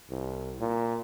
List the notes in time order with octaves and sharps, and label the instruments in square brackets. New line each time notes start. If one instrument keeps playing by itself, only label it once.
[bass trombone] C2
A#2